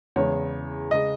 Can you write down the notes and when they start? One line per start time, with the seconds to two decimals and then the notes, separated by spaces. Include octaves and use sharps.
0.16 E2 C#3 G#3 C#5
0.91 C#3 G#3 D#5